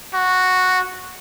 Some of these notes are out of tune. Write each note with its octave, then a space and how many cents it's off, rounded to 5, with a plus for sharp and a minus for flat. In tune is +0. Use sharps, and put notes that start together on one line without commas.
F#4 -5